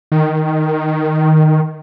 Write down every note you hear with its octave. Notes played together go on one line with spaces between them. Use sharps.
D#3